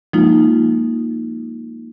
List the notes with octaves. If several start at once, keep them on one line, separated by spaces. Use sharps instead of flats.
F3 G#3 A#3 D#4 F4